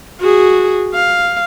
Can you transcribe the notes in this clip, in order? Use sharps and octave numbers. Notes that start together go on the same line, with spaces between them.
F#4 G#4
F5